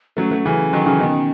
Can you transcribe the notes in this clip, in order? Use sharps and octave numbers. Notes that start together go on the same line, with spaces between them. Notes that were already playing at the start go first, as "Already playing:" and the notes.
F#3 A3 C#4
F#3 A3
C#3 E3
D#3 F#3
C#3 E3
B2 D#3 C#4